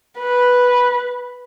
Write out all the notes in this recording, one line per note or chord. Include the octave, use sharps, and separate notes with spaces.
B4